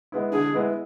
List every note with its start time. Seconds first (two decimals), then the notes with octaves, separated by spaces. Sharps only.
0.12 G#3 B3 E4
0.32 D3 G#4
0.53 G#3 B3 E4